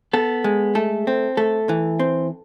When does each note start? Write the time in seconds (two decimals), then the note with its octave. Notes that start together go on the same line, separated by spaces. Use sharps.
0.13 B3 A4
0.44 G#3
0.75 A3 A4
1.07 C4
1.37 A3 A4
1.69 E3
2.00 C4